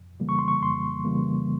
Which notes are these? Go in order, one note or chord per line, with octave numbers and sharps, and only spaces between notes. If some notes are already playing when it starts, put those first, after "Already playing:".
Already playing: F2
C#3 E3 G3 A#3
C#6
C6
C#6
F2 C6
C#3 E3 G3 A#3